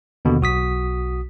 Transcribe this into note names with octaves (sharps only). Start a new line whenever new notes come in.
D#2 B2 D3
B1 F#4 D#6 B6